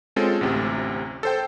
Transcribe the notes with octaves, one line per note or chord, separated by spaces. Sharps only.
G#3 C4 C#4 F4 A4
A1 D2 C3
A4 C5 G5